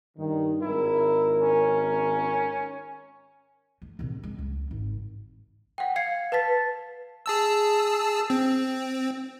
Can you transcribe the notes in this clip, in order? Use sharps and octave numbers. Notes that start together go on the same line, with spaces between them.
G2 D#3
G#1 E4 A#4
C#4
A3
A#1 C3
G#3
C#2
G#1
F#5 G5
F5 G#6 C7 C#7
B4 A5 A6 B6
G#4 A5 E6
C4